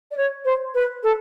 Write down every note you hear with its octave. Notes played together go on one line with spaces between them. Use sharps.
D5
C#5
C5
B4
A4